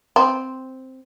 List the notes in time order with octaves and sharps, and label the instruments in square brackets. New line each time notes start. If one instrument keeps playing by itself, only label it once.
[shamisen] C4